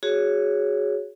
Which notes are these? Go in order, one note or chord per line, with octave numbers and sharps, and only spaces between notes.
F#4 G#4 C#5